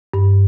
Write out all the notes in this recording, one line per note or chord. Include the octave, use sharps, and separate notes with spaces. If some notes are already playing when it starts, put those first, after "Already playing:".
G2